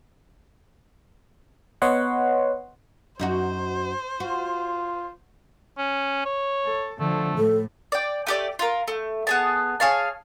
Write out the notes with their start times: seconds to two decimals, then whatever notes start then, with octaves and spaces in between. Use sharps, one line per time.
1.82 B3 B4 C#5 D#5 F#5 C6
3.19 F#2 D#4 F#4 C5
4.20 F4 F#4
5.78 C#4
6.25 C#5
6.65 A4
7.00 D3 F3 A3
7.38 A2 A4
7.92 D5 G5
8.27 A3 G4 D5
8.59 F4 A#4
8.88 A3
9.27 B3 G#4 A5
9.80 G#4 C#5 F5 A5